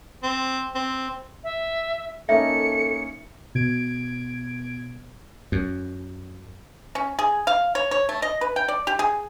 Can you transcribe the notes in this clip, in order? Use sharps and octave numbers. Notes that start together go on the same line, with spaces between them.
C4
C4
E5
A#3 C#4 D#4 A4 E5 C#7
B2 G#6 D7
F#2
C#4
G#4
F5
C#5
C#5
A3
D#5
B4
G5
D5
G4
G#4